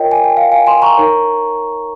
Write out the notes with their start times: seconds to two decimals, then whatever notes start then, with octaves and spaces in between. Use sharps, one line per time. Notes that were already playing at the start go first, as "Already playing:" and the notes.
Already playing: F4 A#4 C#5 D#5 G5
0.11 G#5
0.24 G5
0.37 F5
0.52 F5 G#5
0.67 G#5 C6
0.82 A#5 C#6
0.97 D#4 A#4 C#5